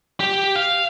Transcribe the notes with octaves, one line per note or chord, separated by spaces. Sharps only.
G4
F5